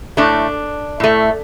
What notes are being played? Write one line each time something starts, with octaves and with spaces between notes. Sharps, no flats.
A2 A3 D4
A2 A3